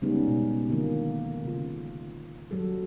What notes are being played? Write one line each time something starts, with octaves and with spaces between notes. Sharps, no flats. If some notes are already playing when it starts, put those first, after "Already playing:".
C#3 G3 G#3 B3 C#4 D#4
B2
D3 D#3 F3 A#3
C#3 F4
F#3 G3 A4